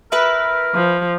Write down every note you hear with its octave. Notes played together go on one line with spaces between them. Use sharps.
E4 A#4 B4
F3